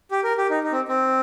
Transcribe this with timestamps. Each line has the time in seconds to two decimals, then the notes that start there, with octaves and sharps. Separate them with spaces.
0.11 G4
0.24 A#4
0.38 G4
0.50 D#4
0.64 D#4
0.72 C4
0.88 C4